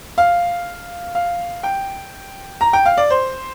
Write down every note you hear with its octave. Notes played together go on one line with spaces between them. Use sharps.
F5
F5
G5
A#5
G5
F5
D5
C5